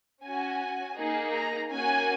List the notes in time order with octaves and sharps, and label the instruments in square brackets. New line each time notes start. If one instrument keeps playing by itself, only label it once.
[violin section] C#4 F#4 G#5
A#3 D#4 G#4
A#5
A#3 C#4 F#4 G#5